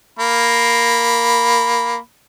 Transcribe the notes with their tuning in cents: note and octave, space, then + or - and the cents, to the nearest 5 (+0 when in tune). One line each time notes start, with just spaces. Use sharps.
A#3 +0 B5 +0